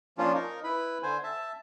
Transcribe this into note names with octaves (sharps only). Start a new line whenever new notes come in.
F3 A#3 C#4 D4 F4
D#4 A#4
E4 B4 B5
D3 C5 G#5
E5 A5